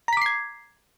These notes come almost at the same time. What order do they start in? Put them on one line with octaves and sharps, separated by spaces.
A#5 B6 D6 C7 G#6